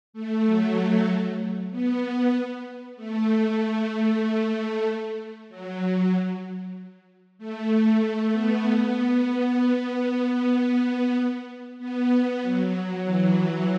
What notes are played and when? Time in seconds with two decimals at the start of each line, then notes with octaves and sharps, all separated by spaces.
0.13 A3
0.45 F#3
1.71 B3
2.97 A3
5.49 F#3
7.38 A3
8.00 A3
8.32 B3
8.64 B3
9.27 B3
11.79 B3
12.42 F#3
13.05 E3